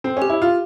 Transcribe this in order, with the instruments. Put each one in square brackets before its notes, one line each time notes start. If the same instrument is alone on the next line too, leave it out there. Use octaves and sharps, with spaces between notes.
[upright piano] C4
C#4
[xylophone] G4
[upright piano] E4
F4